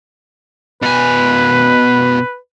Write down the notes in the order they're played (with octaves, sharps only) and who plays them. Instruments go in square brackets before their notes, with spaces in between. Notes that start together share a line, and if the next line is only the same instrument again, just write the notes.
[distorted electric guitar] B2 G#5 [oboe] B4